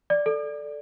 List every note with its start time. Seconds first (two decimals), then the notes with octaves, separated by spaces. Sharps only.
0.10 D5
0.26 A4